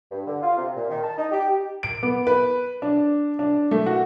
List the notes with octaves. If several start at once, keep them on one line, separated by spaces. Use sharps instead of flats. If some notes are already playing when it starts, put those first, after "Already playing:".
G2
D3
F4
C3
A#2
D#3
A5
D#4
G4
D7
B3
B4
D4
D4
A3
F#4